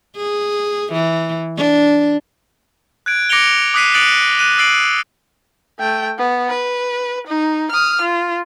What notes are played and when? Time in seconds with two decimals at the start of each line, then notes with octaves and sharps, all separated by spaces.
0.17 G#4
0.92 E3
1.57 D4
3.06 F#6 G#6 D7
3.30 D6 A#6 C#7 D7 F7 G7
3.74 D6 D#6 F#6 B6 C7 D#7
3.94 D#6 F#6 A6 C#7 D7 F#7
4.39 F#6 D#7
4.58 E6 A6 C7 D7 F#7
5.79 A3 G5
6.18 B3
6.49 B4
7.27 D#4
7.72 D#6 F6
8.01 F4